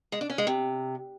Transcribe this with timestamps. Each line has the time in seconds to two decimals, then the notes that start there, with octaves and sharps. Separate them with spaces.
0.12 G#3
0.21 D4
0.30 C#4
0.38 G#3
0.47 C3